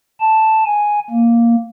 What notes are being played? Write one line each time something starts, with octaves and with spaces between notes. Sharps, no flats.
A5
G#5
A#3